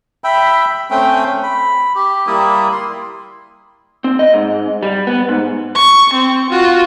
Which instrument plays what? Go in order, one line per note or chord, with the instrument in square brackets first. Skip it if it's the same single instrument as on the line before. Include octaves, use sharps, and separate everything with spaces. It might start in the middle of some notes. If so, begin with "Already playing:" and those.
[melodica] E5 G5 B5
A3 C4 C#4 G5
B5
G4
G3 A#3 E4 D#6
C6
[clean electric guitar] C4
D#5
G#2
G3
B3
G#2
[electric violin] C#6
C4
F4 F#4